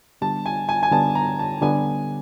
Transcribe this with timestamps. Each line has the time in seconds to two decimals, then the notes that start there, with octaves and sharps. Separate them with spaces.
0.21 D3 G3 B3 D4 G4 A5
0.46 G#5
0.69 G#5
0.83 G#5
0.92 D3 G3 B3 D4 G4 A5
1.15 A#5
1.39 A5
1.62 D3 G3 B3 D4 G4 G#5